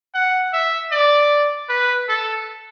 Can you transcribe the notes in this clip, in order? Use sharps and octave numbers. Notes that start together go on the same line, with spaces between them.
F#5
E5
D5
B4
A4